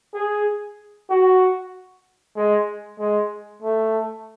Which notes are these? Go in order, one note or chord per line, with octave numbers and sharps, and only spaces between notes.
G#4
F#4
G#3
G#3
A3